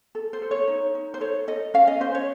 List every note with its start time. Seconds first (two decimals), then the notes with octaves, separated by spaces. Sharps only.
0.15 A4
0.33 C5
0.42 A4
0.51 C#5
0.68 D#4
0.95 D#4
1.14 C5
1.21 A4 C#5
1.48 A4 D#5
1.74 C#4 F5
1.87 D#5
2.00 C#4 C5
2.15 C#5